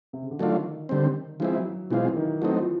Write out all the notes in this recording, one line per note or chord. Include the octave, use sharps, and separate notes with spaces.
C3
C#3
D3
D#3 F#3 A3 D4 F4
D3 G3 C4
E3 F3 G#3 C4 E4
F#3
B2 E3 G#3 C4 F4
D#3
E3 F#3 A3 C4 D#4
F3